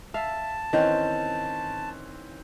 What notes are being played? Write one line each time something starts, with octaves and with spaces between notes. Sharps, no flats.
E5 F5 A5
D#3 E3 C4 C#4